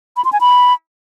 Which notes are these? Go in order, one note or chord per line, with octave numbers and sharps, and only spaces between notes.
B5
C6
G#5
B5